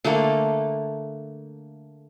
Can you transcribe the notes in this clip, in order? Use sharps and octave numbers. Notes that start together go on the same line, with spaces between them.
D3 A3 A#3 A4